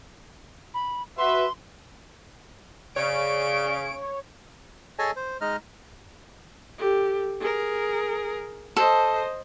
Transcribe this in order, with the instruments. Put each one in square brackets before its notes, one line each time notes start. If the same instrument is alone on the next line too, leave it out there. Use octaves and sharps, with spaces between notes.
[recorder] B5
[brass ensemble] F#4 B4 E5 [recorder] C6
[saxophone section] C#3 [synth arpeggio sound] C#5 [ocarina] D5 [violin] D7
[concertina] G#4 A4 C#5 D#5 G#5 A5
C5
G#3 D#4 D#5 F6
[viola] G4 A4
G#4 A#4
[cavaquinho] A4 [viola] C5 D#5